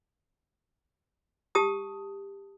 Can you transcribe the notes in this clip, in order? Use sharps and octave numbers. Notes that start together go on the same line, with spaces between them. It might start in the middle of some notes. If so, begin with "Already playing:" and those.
G4 A5 D#6